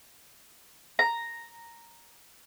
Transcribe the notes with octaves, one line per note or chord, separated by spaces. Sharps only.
A#5